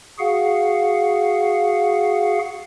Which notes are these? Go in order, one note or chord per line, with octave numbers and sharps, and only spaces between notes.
F#4 G#4 F5 F#5